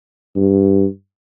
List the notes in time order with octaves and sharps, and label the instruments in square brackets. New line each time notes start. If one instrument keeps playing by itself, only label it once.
[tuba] G2